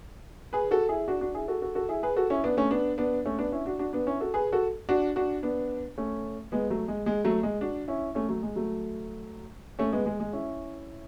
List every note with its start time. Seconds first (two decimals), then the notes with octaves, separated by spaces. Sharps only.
0.53 G#4 B4
0.71 F#4 A4
0.89 E4 G#4
1.08 D4 F#4
1.21 D4 F#4
1.34 E4 G#4
1.48 F#4 A4
1.62 F#4 A4
1.75 F#4 A4
1.89 E4 G#4
2.03 G#4 B4
2.16 F#4 A4
2.30 C#4 E4
2.44 B3 D4
2.57 A3 C#4
2.71 B3 D4
2.98 B3 D4
3.26 A3 C#4
3.39 B3 D4
3.52 C#4 E4
3.66 D4 F#4
3.79 D4 F#4
3.93 B3 D4
4.07 C#4 E4
4.21 F#4 A4
4.34 G#4 B4
4.52 F#4 A4
4.89 D4 F#4
5.16 D4 F#4
5.43 B3 D4
5.98 A3 C#4
6.52 G#3 B3
6.70 F#3 A3
6.88 G#3
7.06 G#3
7.25 F#3 A3
7.43 G#3
7.61 D4 F#4
7.88 C#4 E4
8.15 A3 C#4
8.29 F#3 A3
8.43 G#3
8.56 F#3 A3
9.79 A3 C#4
9.93 G#3 B3
10.06 G#3
10.20 G#3
10.33 C#4 E4